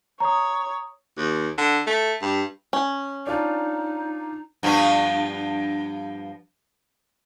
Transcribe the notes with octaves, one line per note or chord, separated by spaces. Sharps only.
C#5 A#5 D#6
D#2
D3
A3
G2
C#4
D4 D#4 F4 A5
G2 F3 B3